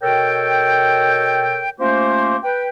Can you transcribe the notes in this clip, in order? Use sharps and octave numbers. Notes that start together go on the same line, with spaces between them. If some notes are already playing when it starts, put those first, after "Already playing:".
B2 A4 A#4 C#5 G5
A3 A#3 C#4 F4 G4 C5
B4 G5